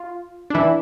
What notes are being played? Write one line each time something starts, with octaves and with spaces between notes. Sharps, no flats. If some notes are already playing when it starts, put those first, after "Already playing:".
Already playing: F4
D4
E3 E4